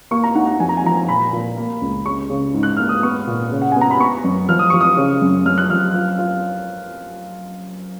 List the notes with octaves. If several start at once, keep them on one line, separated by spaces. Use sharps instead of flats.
A#3 C#6
A#5
D#4 F#5
F#5
F2 G#5
A#5
G#5
F3 A#5
G#5
A#2 B5
A#2
A#3
C#2
C#3 C#6
C#3
G#2
F#6
A#3 F6
D#6
B3 C#6
A#2
C#3
F#5
B3 G#5
A#5
B5
B3 C#6
F#2
F3 F6
D#6
F3 C#6
D#6
C#3
F#2
F#2 F6
F#6
F3 F6
F4
F4